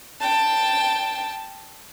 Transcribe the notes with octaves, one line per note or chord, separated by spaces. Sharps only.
G5 A5